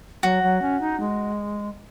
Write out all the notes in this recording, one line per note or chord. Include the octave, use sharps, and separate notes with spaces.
F#3 F#4
F#3
C#4
D#4
G#3